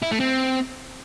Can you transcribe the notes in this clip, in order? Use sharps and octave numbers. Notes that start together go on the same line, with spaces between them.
E4
A3
C4